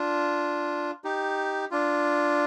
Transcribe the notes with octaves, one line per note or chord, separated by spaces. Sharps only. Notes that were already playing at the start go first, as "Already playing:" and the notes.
Already playing: D4 F4
D#4 G4
D4 F4